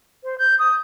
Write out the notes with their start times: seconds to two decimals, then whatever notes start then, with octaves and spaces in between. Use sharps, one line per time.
0.23 C5
0.38 G6
0.58 D#6